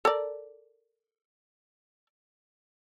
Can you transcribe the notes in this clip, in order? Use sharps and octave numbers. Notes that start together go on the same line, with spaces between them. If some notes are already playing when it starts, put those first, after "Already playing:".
A4 A#4 D5